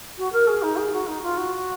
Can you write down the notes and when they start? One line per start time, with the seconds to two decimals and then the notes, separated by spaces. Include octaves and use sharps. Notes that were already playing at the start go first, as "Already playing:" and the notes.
0.17 F#4
0.32 A#4
0.47 G#4
0.62 D#4
0.76 G#4
0.92 F#4
1.07 D#4
1.22 F4
1.37 F#4